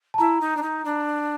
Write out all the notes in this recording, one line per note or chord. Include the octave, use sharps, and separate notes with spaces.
A5
E4 A#5
D#4
D4
D#4
D4